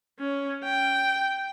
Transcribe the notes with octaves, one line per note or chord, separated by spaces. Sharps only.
C#4
G5